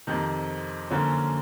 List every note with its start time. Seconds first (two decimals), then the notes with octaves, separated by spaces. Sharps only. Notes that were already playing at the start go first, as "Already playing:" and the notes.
0.07 F2 C3 D#3
0.91 F#2 D3 F3 A#3 C#4